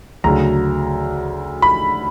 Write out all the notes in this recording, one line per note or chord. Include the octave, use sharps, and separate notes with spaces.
D2 C#3 F#3 A#5
B5